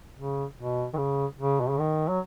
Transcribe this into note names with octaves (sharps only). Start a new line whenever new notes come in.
C#3
B2
D#3
C#3
C#3
B2
C#3
D#3
F#3